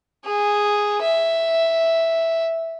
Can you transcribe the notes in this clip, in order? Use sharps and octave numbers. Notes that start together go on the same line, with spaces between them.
G#4
E5